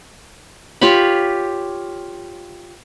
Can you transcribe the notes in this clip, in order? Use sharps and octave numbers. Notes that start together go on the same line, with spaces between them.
F4 G4 C#5 B5